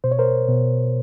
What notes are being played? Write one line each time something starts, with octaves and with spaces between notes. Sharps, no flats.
B2 C5
C#5
A#4 C5
B2